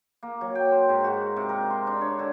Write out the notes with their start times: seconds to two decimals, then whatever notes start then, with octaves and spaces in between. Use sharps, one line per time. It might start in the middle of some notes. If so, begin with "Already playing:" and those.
0.23 A#3
0.41 F#3
0.55 G5
0.72 C5
0.89 G#2
1.04 F#4
1.36 C3
1.49 A#4
1.70 C6
1.87 D4
2.01 C#5
2.19 D3